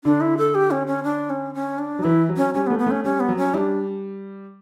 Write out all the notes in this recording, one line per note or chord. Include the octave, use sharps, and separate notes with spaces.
D3 D4
E4
A4
G4
C#4
C#4
D4
C#4
C#4
D4
F#3
E3 E4
F#3
C#4
G3 C#4
B3
A3
B3
A3 C#4
G3 C#4
B3
F#3
C#4
G3 D4 E4